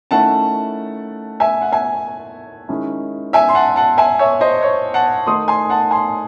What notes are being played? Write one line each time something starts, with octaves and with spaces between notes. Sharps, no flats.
D#3 A3 C#4 E4 F#5 A5
E5 G#5
F#5
E5 G#5
D#3 G#3 C#4 E4
E5 G#5
C6
F#5 A5
F#5 A5
E5 G#5
C#5 E5
C5 D#5
C#5
F#5 A5
D#3 A3 D#4 C6 D#6
G#5 C6
F#5 A5
G#5 C6